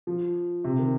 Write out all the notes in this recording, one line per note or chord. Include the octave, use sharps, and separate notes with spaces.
F3
C3
D#3